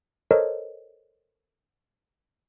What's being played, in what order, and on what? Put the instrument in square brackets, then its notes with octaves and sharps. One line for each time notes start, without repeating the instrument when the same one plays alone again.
[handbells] A4 A#4 C5 C#5 D#5